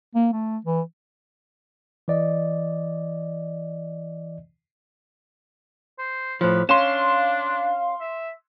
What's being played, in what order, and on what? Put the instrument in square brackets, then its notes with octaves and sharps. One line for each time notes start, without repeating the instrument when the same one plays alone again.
[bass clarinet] A#3
A3
E3
[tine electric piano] E3 D5 D#5
[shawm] C5
[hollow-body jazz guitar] A2 F3 [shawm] B4
[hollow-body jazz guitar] C#4 [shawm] D4 [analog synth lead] F5 [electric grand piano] C6 E7
[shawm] E5